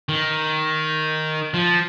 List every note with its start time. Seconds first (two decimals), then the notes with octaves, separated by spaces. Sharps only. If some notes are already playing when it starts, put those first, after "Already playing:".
0.09 D#3
1.54 F3